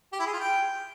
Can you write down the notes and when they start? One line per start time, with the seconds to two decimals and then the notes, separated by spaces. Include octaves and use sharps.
0.12 G4
0.19 E4
0.26 G#4
0.33 F4
0.40 G5